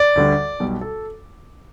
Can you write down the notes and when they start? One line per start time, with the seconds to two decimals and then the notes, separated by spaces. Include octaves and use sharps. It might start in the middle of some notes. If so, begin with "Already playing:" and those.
Already playing: D5
0.16 D2 D3 G3
0.60 B1 B2 G3
0.81 A4